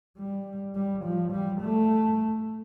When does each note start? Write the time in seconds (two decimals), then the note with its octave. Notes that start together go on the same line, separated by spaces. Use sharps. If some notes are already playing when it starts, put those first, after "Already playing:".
0.18 G3
0.75 G3
1.04 F3
1.32 G3
1.61 A3